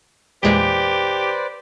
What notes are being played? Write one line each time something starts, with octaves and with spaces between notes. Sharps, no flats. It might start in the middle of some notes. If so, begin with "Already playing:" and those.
E2 A#2 G#3 G4 B4 C5 D5